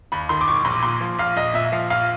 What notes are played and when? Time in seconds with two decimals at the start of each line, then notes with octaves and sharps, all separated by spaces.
0.12 D#2 B5
0.29 D#3 C6
0.41 D6
0.48 E1 C#6
0.65 A#1 C6
0.83 A#2 C6
1.01 F3
1.19 A#1 F5
1.37 A#1 D#5
1.54 A#2 E5
1.72 F3 F5
1.90 A#1 F5